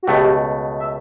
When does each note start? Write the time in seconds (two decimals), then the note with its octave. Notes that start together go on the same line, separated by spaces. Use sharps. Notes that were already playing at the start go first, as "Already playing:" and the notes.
0.03 F#4
0.07 C#2 B2 A3 G4
0.79 E5